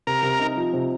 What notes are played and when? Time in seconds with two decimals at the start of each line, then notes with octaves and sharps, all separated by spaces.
0.07 C3 A#4
0.23 C3
0.39 D#4
0.57 F3
0.73 C3